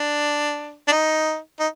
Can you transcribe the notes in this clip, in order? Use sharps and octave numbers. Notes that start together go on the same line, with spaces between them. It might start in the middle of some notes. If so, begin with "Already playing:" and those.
Already playing: D4
D4
D#4
D#4